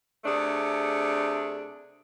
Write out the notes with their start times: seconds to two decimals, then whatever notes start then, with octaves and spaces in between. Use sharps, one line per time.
0.24 C3 A3 D4 G#4